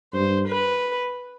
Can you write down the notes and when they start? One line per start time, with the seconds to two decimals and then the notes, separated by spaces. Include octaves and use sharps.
0.13 G2 C5
0.48 B4